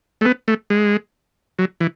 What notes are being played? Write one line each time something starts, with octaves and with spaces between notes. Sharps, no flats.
A3
B3
A3
G#3
F#3
E3